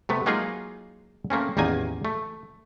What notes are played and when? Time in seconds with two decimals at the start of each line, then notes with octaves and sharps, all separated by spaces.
0.09 C3 A3 B3
0.26 F#3 G#3 A#3 D#4 F4 G#4
1.30 A3 A#3 C4 C#4
1.57 A1 E2 D#3 A#3 G#5
2.05 A3